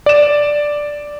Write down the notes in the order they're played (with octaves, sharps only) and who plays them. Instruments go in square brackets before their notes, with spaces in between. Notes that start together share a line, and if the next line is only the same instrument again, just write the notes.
[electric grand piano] D5 E7